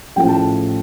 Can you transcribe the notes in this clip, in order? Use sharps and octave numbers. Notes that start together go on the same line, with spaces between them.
A1 A2 F3 A3 G5
A5